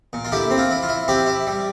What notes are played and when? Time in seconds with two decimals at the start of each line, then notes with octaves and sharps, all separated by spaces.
0.13 A#2
0.25 F4
0.32 D3 E4 G4
0.50 C4
0.58 F4
0.71 E4
0.83 F4
0.88 E4
1.08 C4 E4 G4
1.27 E4
1.47 G3